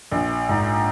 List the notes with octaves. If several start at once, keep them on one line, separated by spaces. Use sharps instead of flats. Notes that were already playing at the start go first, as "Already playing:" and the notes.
A#1
G#2